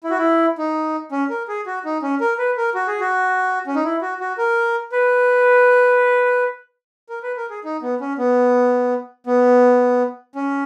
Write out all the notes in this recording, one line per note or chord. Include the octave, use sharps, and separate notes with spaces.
E4
F#4
E4
D#4
C#4
A#4
G#4
F#4
D#4
C#4
A#4
B4
A#4
F#4
G#4
F#4
C#4
D#4
E4
F#4
F#4
A#4
B4
A#4
B4
A#4
G#4
D#4
B3
C#4
B3
B3
C#4